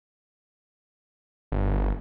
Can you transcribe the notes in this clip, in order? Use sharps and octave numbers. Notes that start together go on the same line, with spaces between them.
G1